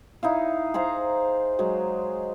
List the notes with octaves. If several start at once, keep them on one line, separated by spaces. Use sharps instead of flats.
D#4 E4 F5
G#4 C5 F5 A#5
F#3 G#3